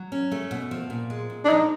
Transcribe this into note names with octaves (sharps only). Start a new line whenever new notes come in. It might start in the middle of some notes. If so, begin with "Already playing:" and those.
Already playing: F#3
C#4
A3
B2
F3
A#2
G#3
A#2
D4
F3 D#4